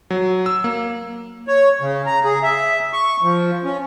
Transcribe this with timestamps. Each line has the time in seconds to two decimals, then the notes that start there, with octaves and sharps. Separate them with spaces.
0.10 F#3
0.46 E6
0.64 A#3
1.47 C#5
1.81 C#3
2.06 A#5
2.24 G#4
2.43 E5
2.93 C#6
3.23 F3
3.64 C#4